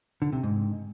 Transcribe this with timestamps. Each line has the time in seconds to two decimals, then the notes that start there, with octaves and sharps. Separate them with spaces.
0.22 D3
0.33 C3
0.43 G#2